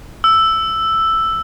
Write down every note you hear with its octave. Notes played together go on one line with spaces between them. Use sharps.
E6